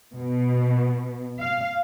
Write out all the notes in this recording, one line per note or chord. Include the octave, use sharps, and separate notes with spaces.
B2
F5